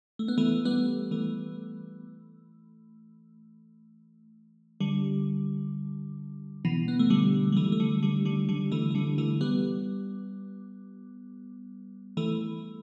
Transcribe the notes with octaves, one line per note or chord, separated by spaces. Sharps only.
A3
B3
E3 A3
G3 B3
E3 A3
D3 G3
B2 E3
B3
A3
D3 G3
G3
E3 A3
A3
D3 G3
D3 G3
D3 G3
D3 G3
E3 A3
A3
D3 G3
E3 A3
G3 B3
E3 A3